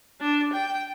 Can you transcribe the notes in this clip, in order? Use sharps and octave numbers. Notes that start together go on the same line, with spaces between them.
D4
G5